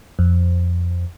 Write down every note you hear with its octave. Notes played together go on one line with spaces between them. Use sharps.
F2